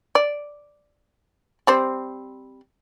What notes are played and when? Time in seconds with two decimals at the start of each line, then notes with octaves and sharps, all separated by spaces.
0.15 D5
1.67 G3 C4 C5